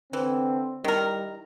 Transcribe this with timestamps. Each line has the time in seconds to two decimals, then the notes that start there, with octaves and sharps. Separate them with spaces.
0.13 D3 E3 C4
0.84 D#3 G3 E4 A#4